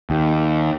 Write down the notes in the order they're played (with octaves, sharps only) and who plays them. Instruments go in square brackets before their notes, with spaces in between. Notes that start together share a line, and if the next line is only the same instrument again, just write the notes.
[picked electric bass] D#2